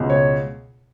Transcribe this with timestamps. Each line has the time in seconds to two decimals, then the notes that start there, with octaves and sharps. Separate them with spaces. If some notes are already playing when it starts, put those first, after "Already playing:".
Already playing: C#2 B2
0.10 C#5